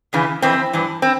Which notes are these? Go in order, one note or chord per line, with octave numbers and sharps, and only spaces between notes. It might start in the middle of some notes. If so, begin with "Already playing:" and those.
E2 C#3 E3
F2 E3 C4
G2 E3
C4